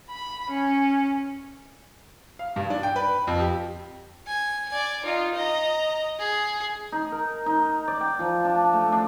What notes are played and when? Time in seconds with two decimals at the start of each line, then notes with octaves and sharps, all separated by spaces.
0.10 B5
0.51 C#4
2.39 F5
2.56 G2
2.70 D4
2.83 G5
2.96 B4
3.27 F2
3.40 G4
4.27 G#5
4.69 D5 G#5
5.05 D#4 F4
5.35 D#5 A#5
6.19 G#4
6.92 D#4
7.12 A#4
7.46 D#4
7.88 D5
8.01 G5
8.19 F3
8.45 D4
8.73 A3
8.92 D4